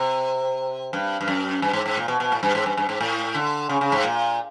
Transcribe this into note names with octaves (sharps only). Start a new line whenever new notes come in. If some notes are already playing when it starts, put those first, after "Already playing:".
Already playing: C3
G2
G2
F#2
G2
G#2
G#2
A#2
B2
B2
A2
G2
G#2
G2
G2
G#2
A2
D3
C#3
C#3
G#2
A#2